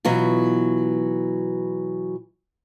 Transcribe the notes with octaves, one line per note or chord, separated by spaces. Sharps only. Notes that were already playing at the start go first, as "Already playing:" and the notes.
B2 E3 F#3 B3 F4